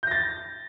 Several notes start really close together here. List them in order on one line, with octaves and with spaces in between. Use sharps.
G6 A#6 A6